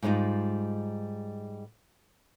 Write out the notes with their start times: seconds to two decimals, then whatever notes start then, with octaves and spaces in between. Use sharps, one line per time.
0.03 G#2 G3 G#3 D#4 F4